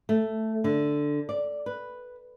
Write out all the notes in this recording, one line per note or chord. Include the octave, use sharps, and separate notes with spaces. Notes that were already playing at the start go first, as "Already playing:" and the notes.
A3
D3
D5
B4